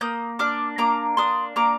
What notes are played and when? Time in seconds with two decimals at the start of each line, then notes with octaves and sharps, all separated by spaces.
0.01 A#3 D#6 G6
0.39 D4 D6 F6
0.78 A#3 A#5 D6
1.17 D4 C6 D#6
1.56 A#3 A#5 D6